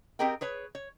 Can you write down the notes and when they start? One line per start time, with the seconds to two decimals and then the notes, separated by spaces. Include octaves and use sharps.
0.19 C4 G4 G#4 A#4 D#5 G5
0.41 G#4 B4 C#5
0.75 C#5